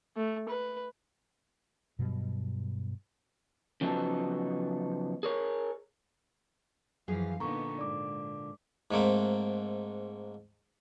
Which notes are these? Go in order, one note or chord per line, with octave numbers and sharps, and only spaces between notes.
A3
B4
G2 B2 F#3 G3
C#3 F3 F#3 B3 D#4 A4
G#4 A#4 C#5
F#2 E3 F3 G#4 F5
A#2 D3 B3 D#4 A#5 C#6
G#2 D5 D6
G#2 A3 A#3 C4